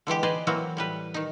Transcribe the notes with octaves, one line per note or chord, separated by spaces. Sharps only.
D3 E3 G#3 G4
G4 G#4 B4 C5 D5 D#5
E3 F#3 A#3 C4 F#4
A2 G3 B4
D#3 D#4